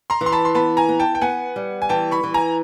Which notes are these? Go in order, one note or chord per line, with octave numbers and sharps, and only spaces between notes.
A#5 C6
E3
C6
A5 B5
C6
B3 A5 B5
G#5 A#5
B3
G5 A5
G5
B3 F#5 G#5
G3
G#5
E3 G5 A5
B5 C#6
E3
G#5 A#5